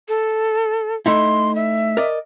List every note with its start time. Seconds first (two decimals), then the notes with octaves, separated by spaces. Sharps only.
0.08 A4
1.06 A3 D#4 E4 C6
1.55 E5
1.97 A#4 D5 D#5